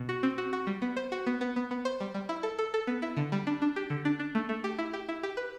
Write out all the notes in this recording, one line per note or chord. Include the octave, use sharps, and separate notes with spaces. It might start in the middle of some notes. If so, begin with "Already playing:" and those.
Already playing: B2
F#4
C4
F#4
F#4
G3
B3
C5
F#4
B3
B3
B3
B3
C5
G3
G3
E4
A4
A4
A4
B3
E4
D3
G3
D4
D4
G4
D3
D4
D4
A3
A3
G4
E4
G4
E4
G4
B4